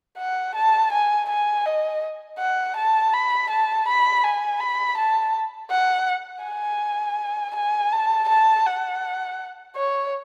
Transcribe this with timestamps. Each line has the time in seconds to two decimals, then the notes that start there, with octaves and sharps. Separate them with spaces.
0.18 F#5
0.55 A5
0.92 G#5
1.29 G#5
1.66 D#5
2.39 F#5
2.76 A5
3.13 B5
3.50 A5
3.87 B5
4.24 G#5
4.60 B5
4.97 A5
5.71 F#5
6.44 G#5
7.55 G#5
7.93 A5
8.29 A5
8.66 F#5
9.76 C#5